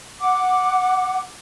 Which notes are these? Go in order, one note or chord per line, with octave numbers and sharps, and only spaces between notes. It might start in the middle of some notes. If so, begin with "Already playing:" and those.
F#5 D6